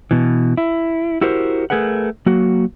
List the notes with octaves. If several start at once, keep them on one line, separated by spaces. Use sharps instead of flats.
B2 E3
E4
E4 F#4 G4 A#4 C5
A3 G#4 A#4 B4 F#5
F#3 A#3 F#4